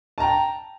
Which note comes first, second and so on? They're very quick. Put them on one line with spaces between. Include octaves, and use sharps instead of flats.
A5 A#5 G5